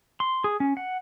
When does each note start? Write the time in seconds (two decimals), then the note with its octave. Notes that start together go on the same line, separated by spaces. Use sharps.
0.20 C6
0.44 G#4
0.60 C#4
0.77 F#5